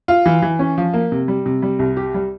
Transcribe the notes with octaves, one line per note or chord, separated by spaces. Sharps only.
F4
E3
E3
C#4
F3
A#3
C3
G3
C3
G3
C2
G4
G3